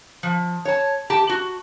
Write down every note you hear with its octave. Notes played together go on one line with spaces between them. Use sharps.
F3
C#5 A5
G4 A5
F#4